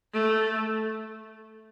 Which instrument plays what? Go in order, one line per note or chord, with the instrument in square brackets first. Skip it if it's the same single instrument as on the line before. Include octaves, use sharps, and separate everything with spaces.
[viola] A3